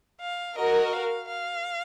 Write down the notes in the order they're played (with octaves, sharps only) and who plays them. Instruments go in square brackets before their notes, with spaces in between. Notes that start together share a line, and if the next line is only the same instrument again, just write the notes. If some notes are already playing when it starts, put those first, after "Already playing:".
[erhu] F5
[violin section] F#4 A#4 [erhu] D#5
[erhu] F5
F5